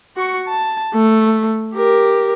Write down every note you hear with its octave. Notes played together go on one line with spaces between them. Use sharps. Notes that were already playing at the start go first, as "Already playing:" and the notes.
F#4 C#6
A5
A3
G4 A#4